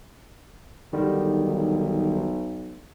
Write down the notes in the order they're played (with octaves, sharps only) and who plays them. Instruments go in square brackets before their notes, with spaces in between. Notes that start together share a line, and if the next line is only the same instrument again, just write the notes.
[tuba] B1 [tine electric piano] D3 D#3 G3